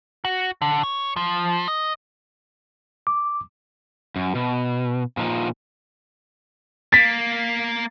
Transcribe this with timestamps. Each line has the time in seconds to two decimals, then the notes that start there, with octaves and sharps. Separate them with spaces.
0.25 F#4
0.62 D3
0.83 C#5
1.16 F3
1.68 D#5
3.07 D6
4.16 F#2
4.35 B2
5.17 A#2 F3 D#4
6.93 A#3 A6 B6